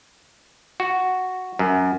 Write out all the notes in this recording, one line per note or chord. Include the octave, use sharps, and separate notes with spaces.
F#4
F#2